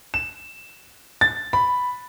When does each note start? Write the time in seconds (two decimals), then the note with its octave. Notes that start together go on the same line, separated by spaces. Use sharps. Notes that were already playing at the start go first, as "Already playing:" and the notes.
0.14 E7
1.21 A6
1.53 B5